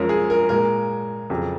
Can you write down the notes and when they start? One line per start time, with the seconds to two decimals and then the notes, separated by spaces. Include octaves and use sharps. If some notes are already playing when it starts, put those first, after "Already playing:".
Already playing: F#2 F3 G#3 C#4 A#4
0.09 G#4
0.30 A#4
0.49 A#2 G#3 A#4
1.30 F2 C#3 F#3